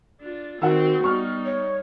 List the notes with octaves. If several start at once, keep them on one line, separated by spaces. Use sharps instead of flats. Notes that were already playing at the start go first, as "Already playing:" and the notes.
D4 F4
D#3 C4 F#4 F#5 E6
G3 B3 D#4 C#6 F6
C#5